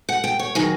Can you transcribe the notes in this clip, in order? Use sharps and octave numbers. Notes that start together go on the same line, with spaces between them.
F#5
G5
C#5
D#3 F#3 G#4